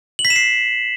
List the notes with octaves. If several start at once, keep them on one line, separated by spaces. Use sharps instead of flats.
F#7
B6
E7
C7